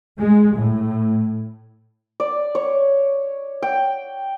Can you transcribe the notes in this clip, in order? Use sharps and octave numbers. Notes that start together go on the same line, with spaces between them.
G#3
A2
D5
C#5
G5